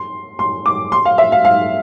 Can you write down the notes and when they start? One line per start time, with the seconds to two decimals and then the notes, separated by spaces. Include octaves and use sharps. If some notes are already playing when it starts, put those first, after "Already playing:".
Already playing: C6
0.39 C6
0.66 D6
0.92 C6
1.05 F5
1.18 E5
1.32 F5
1.45 F5